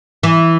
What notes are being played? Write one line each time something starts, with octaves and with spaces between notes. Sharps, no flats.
E3